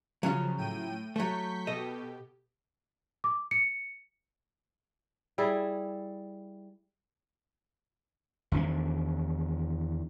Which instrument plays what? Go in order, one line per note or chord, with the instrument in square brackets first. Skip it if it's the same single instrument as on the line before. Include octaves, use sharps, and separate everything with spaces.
[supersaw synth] C#3 F3 [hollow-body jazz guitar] F#3 C#4 F4
[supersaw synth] A2 G5 D#7
[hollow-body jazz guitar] F#3 A3 [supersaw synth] C#6 G6 B6
[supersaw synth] B2 G4 [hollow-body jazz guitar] A4 D#5
[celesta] D6
C#7
[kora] G3 E4 G#4
[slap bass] E2 D#3 C#4 D4